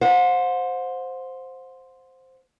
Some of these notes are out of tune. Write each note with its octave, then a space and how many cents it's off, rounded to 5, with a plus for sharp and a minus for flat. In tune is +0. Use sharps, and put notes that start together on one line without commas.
C5 +0 F#5 -40